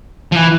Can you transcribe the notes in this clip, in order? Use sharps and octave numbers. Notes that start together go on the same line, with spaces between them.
F3
E3